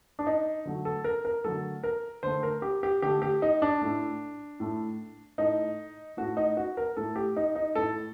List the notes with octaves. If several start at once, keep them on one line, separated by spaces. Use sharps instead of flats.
D4
D#4
D3 F#3 A3
A4
A#4
A#4
D3 F#3 A3 A4
A#4
D3 A3 C5
A#4
G4
G4
D3 A3 G4
G4
D#4
D4
A2 A3
A2 A3
A2 A3 D#4
A2 A3 F#4
D#4
F#4
A#4
A2 A3 A4
G4
D#4
D#4
A2 A3 A4